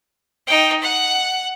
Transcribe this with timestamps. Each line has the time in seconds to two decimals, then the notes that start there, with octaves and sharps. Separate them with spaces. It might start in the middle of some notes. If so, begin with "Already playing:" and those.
0.47 D#4 G5
0.82 F#5